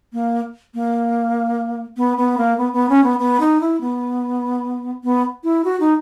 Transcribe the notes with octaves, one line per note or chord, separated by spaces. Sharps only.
A#3
A#3
B3
B3
A#3
B3
B3
C#4
B3
B3
D#4
E4
B3
B3
E4
F#4
D#4